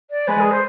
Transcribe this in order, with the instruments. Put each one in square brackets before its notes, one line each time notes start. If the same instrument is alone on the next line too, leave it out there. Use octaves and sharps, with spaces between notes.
[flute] D5
[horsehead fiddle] G#3 [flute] B4
[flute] G#4
C5